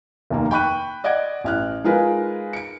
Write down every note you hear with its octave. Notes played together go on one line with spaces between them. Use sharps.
F1 D#2 A#3
G5 B5 C#6 F#6 D#7
D5 D#5 F#5 G#6 D7
A1 F6 F#6
G#3 D#4 F4 G#4 A#4 B4
C#7 D7